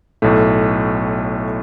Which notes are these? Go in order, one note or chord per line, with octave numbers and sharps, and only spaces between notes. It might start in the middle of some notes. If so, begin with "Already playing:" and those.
B1 A2 A3